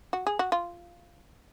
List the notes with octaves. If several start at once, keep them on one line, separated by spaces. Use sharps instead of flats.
F#4
G#4
F#4
F4